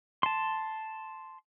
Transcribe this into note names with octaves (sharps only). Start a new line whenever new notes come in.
A5 C6